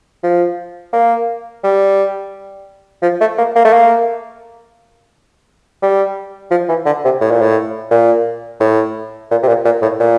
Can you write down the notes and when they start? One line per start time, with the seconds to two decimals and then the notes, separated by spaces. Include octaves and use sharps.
0.24 F3
0.93 A#3
1.64 G3
3.03 F3
3.21 A3
3.38 A#3
3.56 A#3
3.65 A3
3.73 A#3
5.83 G3
6.51 F3
6.69 E3
6.86 D3
7.05 C3
7.21 A2
7.31 A#2
7.42 A2
7.91 A#2
8.60 A2
9.31 A#2
9.43 C3
9.48 A#2
9.65 A#2
9.82 A2
10.00 A#2